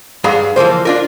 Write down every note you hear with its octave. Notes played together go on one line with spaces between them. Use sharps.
G2 G#4 F5 F#5 A#5 B5
E3 F3 A#3 C5
D4 F4 A#4